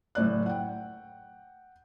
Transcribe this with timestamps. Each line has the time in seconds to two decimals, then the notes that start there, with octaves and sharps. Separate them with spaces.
0.15 F#1 A2 D5 F#6
0.46 F#5 G5